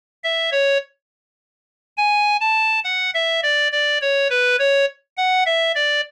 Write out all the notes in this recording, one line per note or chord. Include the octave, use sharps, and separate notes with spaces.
E5
C#5
G#5
A5
F#5
E5
D5
D5
C#5
B4
C#5
F#5
E5
D5